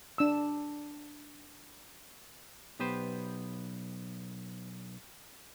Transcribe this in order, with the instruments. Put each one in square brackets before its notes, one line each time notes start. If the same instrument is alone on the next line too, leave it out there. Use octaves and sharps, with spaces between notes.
[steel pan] D4 E6
[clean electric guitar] B1 B3 G4 B4 C5